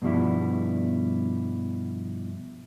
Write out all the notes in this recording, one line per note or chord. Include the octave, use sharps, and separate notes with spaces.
G2 B2 F3 G3 E4